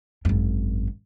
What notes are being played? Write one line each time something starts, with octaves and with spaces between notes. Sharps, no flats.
G#1 F#2